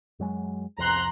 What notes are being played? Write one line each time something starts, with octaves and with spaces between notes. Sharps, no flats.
F#2 F#3 G#3
C2 F2 A#5 C6 F#6